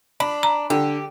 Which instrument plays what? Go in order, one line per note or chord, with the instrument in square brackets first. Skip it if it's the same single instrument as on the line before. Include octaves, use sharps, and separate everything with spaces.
[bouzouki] D4 [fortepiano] B5
[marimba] A#5
[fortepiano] D3 [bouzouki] G4